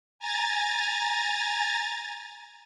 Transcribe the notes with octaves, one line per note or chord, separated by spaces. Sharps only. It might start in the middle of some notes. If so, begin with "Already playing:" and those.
G#5 A#5 A6